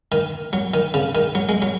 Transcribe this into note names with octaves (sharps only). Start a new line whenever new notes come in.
D#3
F#3
D#3
C#3
D#3
F#3
G#3
F#3